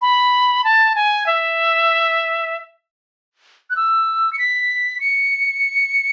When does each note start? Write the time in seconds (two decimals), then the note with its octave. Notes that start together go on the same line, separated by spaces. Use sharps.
0.02 B5
0.64 A5
0.95 G#5
1.26 E5
3.70 F#6
3.76 E6
4.33 C#7
4.39 B6
5.00 C#7